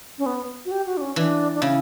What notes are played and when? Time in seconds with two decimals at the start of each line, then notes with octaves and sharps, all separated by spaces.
0.18 C#4
0.26 B3
0.65 F#4
0.71 G4
0.86 F#4
0.97 D4
1.01 C#4
1.16 E3 D4
1.54 D4
1.62 C#3 E4